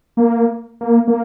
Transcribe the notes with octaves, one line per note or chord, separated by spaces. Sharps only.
A#3
A#3
A#3